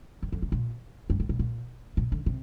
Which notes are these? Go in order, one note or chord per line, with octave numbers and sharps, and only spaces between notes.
G2
F2
C3
A#2
G2
A2
A#2
A#2
A#2
D3
C3